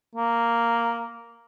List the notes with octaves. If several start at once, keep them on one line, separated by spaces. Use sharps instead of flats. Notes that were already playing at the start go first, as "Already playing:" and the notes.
A#3